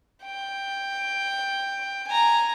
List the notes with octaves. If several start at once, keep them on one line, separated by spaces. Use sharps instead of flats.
G5
G#5 A#5